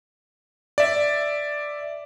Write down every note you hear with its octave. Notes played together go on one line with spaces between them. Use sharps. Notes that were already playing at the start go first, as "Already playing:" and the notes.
D5 E5